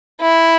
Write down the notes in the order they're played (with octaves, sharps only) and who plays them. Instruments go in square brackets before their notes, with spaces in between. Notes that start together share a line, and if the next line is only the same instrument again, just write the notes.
[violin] E4